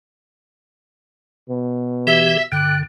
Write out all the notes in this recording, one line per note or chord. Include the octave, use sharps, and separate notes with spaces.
B2
E3 G4 E5 B6
G2 D3 G5 F#6